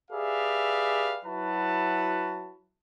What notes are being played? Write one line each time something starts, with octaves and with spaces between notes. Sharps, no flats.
G4 G#4 B4 D5 E5 F5
F#3 E4 F#4 B4 A5